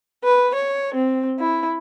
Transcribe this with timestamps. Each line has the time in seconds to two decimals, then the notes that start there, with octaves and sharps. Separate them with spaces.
0.24 B4
0.54 C#5
0.95 C4
1.40 E4